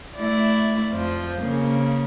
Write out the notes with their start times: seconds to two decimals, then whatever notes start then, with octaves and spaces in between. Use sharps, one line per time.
0.17 A3 E4 D5
0.92 F2 F3 C5
1.42 C#3 A#3